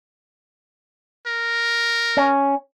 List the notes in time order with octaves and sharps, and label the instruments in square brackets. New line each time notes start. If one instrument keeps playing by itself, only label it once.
[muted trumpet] A#4
[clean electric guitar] C#4